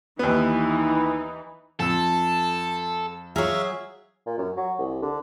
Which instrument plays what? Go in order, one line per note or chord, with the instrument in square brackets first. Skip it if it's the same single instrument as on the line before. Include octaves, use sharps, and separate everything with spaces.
[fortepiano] D#2 B3 [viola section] E3 D#4
[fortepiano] F2 E6 [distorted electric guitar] A4 [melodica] A5
[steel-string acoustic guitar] F#3 G#4 [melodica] E5 F5 [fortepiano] A#5 C#6
[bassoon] A#2
F#2
F#3
C2
D3